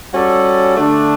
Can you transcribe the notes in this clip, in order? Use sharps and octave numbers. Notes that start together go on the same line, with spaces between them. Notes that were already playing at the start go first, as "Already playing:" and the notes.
G3 C#4 F#4 A4 D5
D3 A3 D4